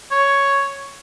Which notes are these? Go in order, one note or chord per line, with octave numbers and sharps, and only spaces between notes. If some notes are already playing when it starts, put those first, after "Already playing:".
C#5